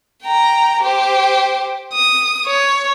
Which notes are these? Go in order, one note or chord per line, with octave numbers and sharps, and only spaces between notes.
G5 A#5
G4 C5
D#6
C#5